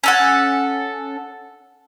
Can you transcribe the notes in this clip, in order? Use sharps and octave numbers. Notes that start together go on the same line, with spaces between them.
C#4 A4 F#5